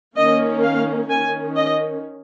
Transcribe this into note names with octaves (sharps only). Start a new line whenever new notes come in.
D#3 A#3 C#4 D#5
F5
D#3 C#4 G#5
D#5